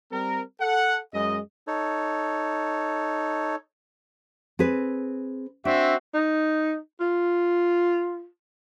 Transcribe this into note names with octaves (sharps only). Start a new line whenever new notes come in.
G3 C4 A#4
A4 F#5
F#2 G#3 D#5
D#4 A4 C#5
C4 G#4 B4
C4 D4 F#4 E5
D#4
F4